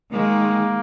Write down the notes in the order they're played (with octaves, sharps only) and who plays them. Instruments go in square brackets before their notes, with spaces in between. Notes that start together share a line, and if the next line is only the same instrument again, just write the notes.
[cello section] D#3 G#3 [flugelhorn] A#3